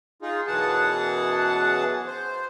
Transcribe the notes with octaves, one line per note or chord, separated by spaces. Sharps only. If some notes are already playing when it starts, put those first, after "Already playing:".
D#4 F4 G#4
F#2 B2 E3 G#4 F#5 A5
C5